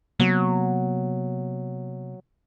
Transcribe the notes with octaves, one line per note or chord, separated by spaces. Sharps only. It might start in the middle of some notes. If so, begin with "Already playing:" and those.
C3 F#3 A#3 B3